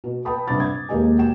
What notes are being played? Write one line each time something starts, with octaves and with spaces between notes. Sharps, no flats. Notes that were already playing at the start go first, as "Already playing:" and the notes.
B2
B4 G5 A5 B5 D#6
G2 C3 D4 B5 D6 A6
G#6
D#2 G#3 A#3 G4 D#5 G#5
B2 G5 E7